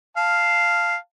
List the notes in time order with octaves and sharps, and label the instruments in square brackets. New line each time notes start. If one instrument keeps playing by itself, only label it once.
[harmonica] F5 A5